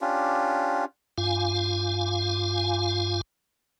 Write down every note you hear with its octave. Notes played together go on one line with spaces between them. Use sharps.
C#4 D4 F4 G4
G2 F4 F5 G#5